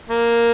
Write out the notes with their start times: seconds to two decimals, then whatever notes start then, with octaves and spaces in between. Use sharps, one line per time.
0.09 A#3